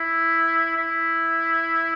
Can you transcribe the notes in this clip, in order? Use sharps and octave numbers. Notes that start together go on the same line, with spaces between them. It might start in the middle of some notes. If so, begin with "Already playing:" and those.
Already playing: E4
E4